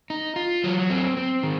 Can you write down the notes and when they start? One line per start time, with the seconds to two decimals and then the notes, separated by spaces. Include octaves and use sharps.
0.10 D#4
0.36 F4
0.64 F#3
0.90 C4
1.17 C4
1.43 D#3